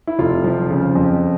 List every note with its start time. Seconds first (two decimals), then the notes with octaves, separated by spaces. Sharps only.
0.07 E4
0.19 F1 F4
0.44 F3
0.71 C#3
0.95 F2